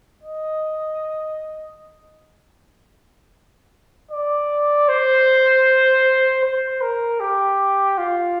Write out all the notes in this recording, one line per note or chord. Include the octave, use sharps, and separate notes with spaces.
D#5
D5
C5
C5
A#4
G4
F4